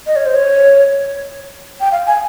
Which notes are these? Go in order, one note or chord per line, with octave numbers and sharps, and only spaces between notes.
D#5
C#5
C5
C#5
G5
F5
G#5